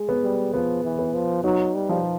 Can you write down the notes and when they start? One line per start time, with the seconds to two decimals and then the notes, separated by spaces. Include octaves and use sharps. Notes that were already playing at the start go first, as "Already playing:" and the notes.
Already playing: G#3
0.09 B3
0.23 G3
0.54 F3 B3
0.84 E3
0.99 B3
1.14 F3
1.44 F#3 D#4
1.74 G3
1.89 F3